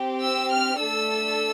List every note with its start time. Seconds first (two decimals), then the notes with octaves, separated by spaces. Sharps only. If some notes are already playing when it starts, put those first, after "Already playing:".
Already playing: C4 G4
0.22 E6
0.52 F6
0.80 A3 D4 A4 E6